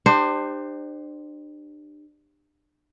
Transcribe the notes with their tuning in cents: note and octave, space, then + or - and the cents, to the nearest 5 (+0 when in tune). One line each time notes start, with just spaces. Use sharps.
D4 +35 G4 +15 C5 +0